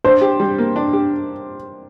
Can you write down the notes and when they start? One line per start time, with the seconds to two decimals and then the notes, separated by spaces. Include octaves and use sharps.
0.04 D4 C5
0.21 G4
0.40 G3
0.58 A#3
0.76 D4
0.93 G4